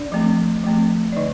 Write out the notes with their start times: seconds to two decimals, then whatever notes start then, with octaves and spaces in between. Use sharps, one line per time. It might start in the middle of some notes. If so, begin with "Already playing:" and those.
Already playing: D4 D5
0.12 F3 A3 C4
0.64 F3 A3 C4
1.12 D5
1.16 D3 D#4 D#5